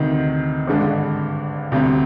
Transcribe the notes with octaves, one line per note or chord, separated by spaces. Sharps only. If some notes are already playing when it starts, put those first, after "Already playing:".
Already playing: D2 C3 D#3
G#1 G2 D3 G#3 D4
D2 C3 G3